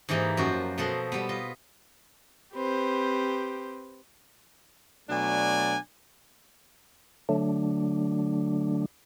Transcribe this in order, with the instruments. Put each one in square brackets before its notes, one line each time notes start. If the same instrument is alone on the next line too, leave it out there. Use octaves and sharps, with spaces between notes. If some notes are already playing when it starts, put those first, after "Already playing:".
[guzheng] G#2 E3 A#3 G4 D#5
F#2 F3 F#4 C5
B2 F3 A4 D#5 F#5 C6
G3 B3
F4 D#5
[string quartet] C4 G4 B4 C5
[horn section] B2 F#3 A3 D4 D5 G#5
[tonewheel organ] D3 F#3 A3 D4